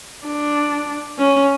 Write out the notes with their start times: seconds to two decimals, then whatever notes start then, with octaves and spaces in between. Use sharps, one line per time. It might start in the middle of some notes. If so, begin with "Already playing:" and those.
0.26 D4
1.18 C#4